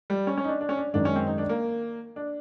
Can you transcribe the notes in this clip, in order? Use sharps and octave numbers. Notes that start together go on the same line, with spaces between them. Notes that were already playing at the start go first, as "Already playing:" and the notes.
G3
C#4
C#4
D#4
D4
D4
C#4
D4
F#2 D#3 G#3 D4
C#4
C4
D#4
D4
A#3
D4